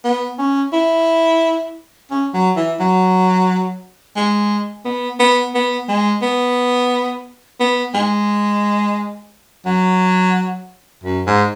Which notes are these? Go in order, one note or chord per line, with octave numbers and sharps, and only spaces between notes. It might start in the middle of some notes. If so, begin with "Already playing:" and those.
B3
C#4
E4
C#4
F#3
E3
F#3
G#3
B3
B3
B3
G#3
B3
B3
G#3
F#3
F#2
G#2